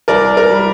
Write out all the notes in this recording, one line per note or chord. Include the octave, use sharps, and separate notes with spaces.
C2 A#4 D5
A#4
G3